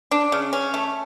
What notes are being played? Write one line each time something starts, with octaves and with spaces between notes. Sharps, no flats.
D4
C#3
C#4
A3